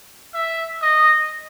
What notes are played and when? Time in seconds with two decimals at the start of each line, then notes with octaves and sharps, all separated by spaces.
0.34 E5
0.82 D#5